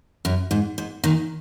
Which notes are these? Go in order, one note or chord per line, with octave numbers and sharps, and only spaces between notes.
F#2
G#2
G#2
A#2 D#3